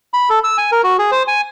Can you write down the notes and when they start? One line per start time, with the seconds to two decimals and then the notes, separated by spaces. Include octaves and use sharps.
0.14 B5
0.30 A4
0.44 E6
0.58 G#5
0.72 A#4
0.84 F#4
0.99 G#4
1.12 C5
1.28 G#5